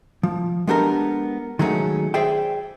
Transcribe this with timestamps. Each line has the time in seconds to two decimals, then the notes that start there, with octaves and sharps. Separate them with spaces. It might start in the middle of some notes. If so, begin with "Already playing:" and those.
0.23 F3
0.67 G#3 B3 D4 G4 A4 A#4
1.59 D#3 F#3 G#3 A3 C#4
2.14 G#4 C5 D5 E5 G5